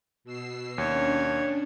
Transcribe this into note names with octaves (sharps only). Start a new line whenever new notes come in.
B2 E6 C7
D#2 C#4 D4 C#5